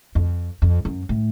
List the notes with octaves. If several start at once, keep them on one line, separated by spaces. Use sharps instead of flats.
F2
F2
F#2
A2